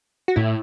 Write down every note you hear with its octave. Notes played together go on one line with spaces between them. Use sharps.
F#4
A2 E4